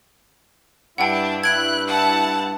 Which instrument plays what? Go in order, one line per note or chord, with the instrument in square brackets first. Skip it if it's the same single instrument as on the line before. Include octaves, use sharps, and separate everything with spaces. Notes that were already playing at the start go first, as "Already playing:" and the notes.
[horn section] G2 E4 [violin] D4 A5 [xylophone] F#5 G5
[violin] F#6 [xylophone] G#6 D7 F#7
[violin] F#5 A5